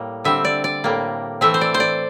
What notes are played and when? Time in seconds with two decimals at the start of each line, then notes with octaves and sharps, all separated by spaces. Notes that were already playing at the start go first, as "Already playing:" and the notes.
Already playing: A2 G3 A#3
0.24 D3 G3 C4 E5
0.45 D5
0.64 D5
0.84 A2 G3 A#3
1.41 E3 A3 C4 E5
1.54 C5
1.61 D5
1.74 C5
1.80 D5